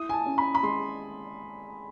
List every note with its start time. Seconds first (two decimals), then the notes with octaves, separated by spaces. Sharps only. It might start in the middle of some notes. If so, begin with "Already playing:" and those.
Already playing: E4 D#6
0.09 G#5
0.13 A5
0.26 C#4
0.38 B5
0.55 B5
0.63 G#3 C6